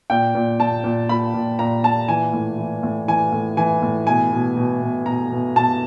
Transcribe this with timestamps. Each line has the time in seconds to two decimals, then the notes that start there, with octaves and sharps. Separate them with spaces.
0.10 A#2 G5
0.35 A#2
0.60 A#2 A5
0.84 A#2
1.09 A#2 B5
1.34 A#2
1.59 A#2 A#5
1.84 A#2 A5
2.08 E3 G#5
2.33 A2
2.58 E3
2.83 A2
3.08 E3 G#5
3.32 A2
3.57 E3 G#5
3.82 A2
4.07 B2 G#5
4.32 B2
4.57 B2
4.81 B2
5.06 B2 A#5
5.31 B2
5.56 B2 A5